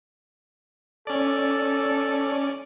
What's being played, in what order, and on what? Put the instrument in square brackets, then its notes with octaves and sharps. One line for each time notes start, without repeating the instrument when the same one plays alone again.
[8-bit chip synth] C#4 D5 [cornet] A4